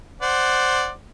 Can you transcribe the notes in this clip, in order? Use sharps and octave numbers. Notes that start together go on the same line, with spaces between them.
C5 D5 F#5